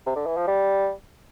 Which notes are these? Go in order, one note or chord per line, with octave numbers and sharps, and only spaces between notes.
C3
D3
E3
F3
G3